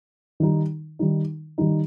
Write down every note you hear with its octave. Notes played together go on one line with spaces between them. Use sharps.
D#3 G3 D#4
D#3 G3 D#4
D#3 G3 D#4